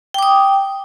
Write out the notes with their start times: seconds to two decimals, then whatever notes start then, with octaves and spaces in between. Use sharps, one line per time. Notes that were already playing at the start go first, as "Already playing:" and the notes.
0.14 G5
0.18 D6
0.23 D#6